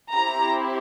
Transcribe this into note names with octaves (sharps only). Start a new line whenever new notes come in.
C4 E4 G4 A#5